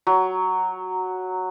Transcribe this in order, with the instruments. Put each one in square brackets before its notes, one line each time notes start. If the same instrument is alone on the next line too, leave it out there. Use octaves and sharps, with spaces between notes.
[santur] F#3